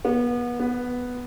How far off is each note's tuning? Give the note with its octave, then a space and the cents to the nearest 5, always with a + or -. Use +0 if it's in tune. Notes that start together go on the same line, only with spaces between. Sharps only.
B3 -30
B3 +0